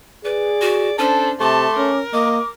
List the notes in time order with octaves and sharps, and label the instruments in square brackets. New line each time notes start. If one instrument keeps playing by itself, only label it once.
[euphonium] G#4 [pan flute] B4 [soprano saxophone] D5
[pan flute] F#4
[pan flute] C#4 [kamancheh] D4 C5 [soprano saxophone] A4
[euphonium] C3 [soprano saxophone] A3 [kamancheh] A5 C6 [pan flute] D6
[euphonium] C#4 [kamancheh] A#4
[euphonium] A#3 [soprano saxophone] D#5 [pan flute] D6